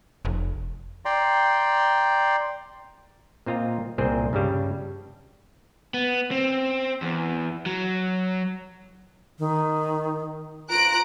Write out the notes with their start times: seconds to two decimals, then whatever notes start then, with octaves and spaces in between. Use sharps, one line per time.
0.25 F1
1.05 D5 G5 A#5 C6
3.46 A#2 C4 F4 D#5 A#5
3.98 C2 A#2 C4 G#4 C5 G5
4.33 G2 C#3 G3 D4
5.94 B3
6.31 C4
7.02 E2
7.66 F#3
9.39 D#3
10.70 F4 A#5 F#6 D7